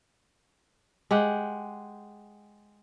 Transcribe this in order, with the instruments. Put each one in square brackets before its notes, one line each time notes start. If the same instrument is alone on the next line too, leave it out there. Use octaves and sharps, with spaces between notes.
[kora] G#3 G4 F#5